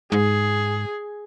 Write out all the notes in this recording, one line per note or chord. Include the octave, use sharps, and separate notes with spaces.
G#2 G#4